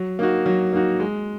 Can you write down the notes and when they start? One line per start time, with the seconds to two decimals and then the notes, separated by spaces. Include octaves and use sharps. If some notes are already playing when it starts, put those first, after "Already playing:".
Already playing: F#3
0.19 A#3 D#4 F#4
0.46 F#3
0.73 A#3 D#4 F#4
1.00 G#3